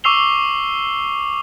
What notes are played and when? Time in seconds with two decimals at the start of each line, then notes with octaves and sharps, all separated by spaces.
0.04 C#6 D6 E6 C7 F7 G7